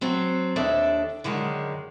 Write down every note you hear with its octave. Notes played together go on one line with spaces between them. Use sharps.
F#3 C4 A4
D#2 D4 A4 E5
F#2 D3 D#3 G#3 A5